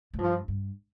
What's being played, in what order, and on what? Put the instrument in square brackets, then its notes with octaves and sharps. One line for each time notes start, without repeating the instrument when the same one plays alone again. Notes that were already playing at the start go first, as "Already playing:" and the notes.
[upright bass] A2
[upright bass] G2 [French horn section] F3
[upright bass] G2